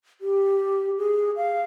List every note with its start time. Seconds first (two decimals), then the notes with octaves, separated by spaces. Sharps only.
0.21 G4
0.98 G#4
1.36 F5